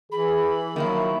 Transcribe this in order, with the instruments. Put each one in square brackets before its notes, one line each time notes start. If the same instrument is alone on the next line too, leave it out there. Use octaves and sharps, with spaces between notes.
[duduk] E3 [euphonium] G#4 [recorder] B5
[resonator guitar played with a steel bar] D#3 F3 E4 [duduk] F#3 [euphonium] A#3